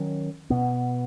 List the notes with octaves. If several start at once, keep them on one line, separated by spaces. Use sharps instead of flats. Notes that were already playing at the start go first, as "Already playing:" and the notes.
Already playing: D#3 F#3 C#4
B2 B3